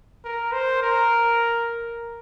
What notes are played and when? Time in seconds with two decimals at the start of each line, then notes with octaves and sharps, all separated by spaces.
0.25 A#4
0.52 C5
0.82 A#4